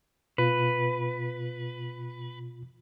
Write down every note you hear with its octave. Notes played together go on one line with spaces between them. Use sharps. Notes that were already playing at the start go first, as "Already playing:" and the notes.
B2 F4 B4